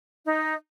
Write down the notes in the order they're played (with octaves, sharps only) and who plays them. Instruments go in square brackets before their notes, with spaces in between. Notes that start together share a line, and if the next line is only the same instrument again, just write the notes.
[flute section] D#4